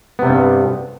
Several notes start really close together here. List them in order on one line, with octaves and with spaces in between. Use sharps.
B3 C3 G3 G2